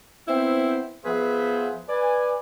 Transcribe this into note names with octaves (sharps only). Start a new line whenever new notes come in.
B3 C4 E4 C5 E5 G5
F3 B3 G#4 B4 C5 E5
B4 D5 G#5